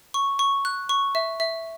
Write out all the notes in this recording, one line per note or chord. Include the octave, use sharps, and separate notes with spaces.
C#6
C#6
F#6
C#6
E5
E5